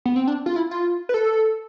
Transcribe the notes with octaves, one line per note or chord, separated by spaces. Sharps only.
B3
C4
D4
F4
E4
F4
B4
A4